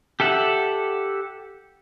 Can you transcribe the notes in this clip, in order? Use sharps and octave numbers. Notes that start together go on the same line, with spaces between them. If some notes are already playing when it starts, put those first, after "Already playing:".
G4 A4 E5 F#5